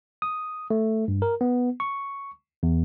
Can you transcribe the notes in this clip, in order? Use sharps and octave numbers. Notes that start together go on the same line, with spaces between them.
D#6
A3
G2
A#4
B3
C#6
E2